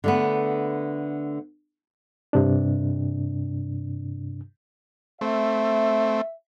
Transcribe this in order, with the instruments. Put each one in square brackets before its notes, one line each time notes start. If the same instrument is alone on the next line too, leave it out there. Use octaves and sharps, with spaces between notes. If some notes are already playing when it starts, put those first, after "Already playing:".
[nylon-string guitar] D3 A3 B3
[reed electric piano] G2 C3 D4
[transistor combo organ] A3 C4 [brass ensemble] E5